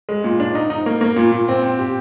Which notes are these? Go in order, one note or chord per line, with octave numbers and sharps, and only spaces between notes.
G#3
A#2
D4
D#4
D#4
A#3
A#3
A#2
A#2
C4
C4
G4